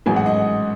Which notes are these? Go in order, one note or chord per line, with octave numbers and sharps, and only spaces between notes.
A1 G#2 F#3 G#5
F#5
D#5